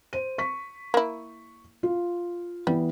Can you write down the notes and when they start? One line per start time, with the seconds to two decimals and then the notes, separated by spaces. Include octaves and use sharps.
0.13 C5 D#7
0.38 C#6 B6
0.94 A#3 E4
1.83 F4
2.67 E3 G3 B3